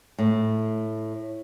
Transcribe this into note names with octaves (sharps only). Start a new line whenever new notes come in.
A2